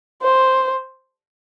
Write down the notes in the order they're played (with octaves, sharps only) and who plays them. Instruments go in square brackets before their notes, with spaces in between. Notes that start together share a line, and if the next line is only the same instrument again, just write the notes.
[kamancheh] C5